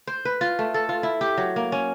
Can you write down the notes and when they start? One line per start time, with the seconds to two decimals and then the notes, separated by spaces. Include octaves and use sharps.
0.07 C5
0.25 B4
0.41 F4
0.59 A3
0.74 A4
0.89 F4
1.03 E4
1.21 G4
1.38 F#3
1.56 A#3
1.72 C#4